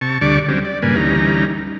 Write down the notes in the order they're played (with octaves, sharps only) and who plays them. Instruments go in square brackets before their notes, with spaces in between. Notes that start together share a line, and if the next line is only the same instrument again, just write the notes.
[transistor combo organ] C3 A5 C#6
D2 D3 G3 D5 C#6 D6
D3 F#3 G3 C4 C#4
D5
G2 A#2 C#3 A#3 B4 G#5
D2 E3 G3 C#4 D#4 A#5